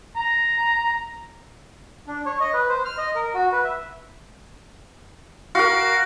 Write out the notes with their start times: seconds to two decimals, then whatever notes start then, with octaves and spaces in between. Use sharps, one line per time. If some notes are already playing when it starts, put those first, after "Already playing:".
0.16 A#5
2.07 D4
2.26 C#5
2.40 D#5
2.54 B4
2.69 C5
2.85 F6
2.98 D#5
3.15 A#4
3.35 F#4
3.52 B4
3.64 E5
5.55 F#4 A#4 F5